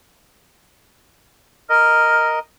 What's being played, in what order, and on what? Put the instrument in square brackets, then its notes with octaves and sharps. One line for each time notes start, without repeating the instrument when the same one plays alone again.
[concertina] A#4 D#5 [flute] F6